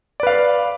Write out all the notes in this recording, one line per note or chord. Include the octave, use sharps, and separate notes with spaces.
B4 D5 F5